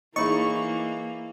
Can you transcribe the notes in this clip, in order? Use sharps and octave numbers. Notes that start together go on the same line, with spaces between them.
E3 A#3 D#4 E4 G#4 C#5 D#5 C#6